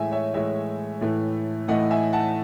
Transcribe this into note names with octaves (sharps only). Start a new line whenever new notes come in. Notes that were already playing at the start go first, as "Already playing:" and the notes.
Already playing: A2 E3 G#3 E5 G#5
C#5 E5
A2 E3 G#3 C#5 E5
A2 E3 A3
A2 E3 A3 D#5 F#5
E5 G#5
F#5 A5